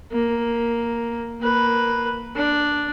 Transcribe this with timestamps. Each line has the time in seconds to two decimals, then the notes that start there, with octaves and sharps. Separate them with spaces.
0.12 A#3
1.41 A#3 B4
2.35 D4